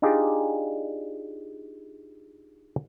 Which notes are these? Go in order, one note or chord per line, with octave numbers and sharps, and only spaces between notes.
D4 D#4 F4 G4 G#4 D5